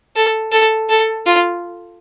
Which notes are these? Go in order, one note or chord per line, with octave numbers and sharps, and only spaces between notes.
A4
A4
A4
F4